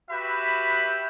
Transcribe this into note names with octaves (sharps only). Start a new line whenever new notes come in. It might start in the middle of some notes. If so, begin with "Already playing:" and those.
F#4 G4 B4 E5 B5